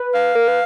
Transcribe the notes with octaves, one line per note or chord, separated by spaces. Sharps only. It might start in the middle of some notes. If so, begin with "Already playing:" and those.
Already playing: B4
F5
A#4
B4